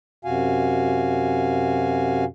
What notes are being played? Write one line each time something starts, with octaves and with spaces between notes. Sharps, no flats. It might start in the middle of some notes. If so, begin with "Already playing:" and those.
F#2 C3 F#4 F5 G#5